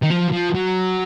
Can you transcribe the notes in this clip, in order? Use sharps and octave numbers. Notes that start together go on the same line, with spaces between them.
D#3
F3
F3
F#3